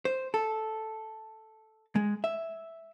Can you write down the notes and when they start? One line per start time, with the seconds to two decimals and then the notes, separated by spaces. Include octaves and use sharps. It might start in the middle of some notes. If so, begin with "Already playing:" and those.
0.05 C5
0.34 A4
1.96 G#3
2.24 E5